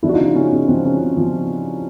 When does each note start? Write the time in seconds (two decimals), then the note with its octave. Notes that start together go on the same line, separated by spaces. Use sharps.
0.03 F3 D4 E4
0.09 F#4
0.14 D#4 F4
0.19 C#3
0.36 C#3 C#4
0.52 C#3
0.68 F3 C4
0.84 C#3 C#4
1.01 C#3
1.17 F3